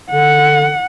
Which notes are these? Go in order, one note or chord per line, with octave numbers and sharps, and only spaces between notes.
D3 F#5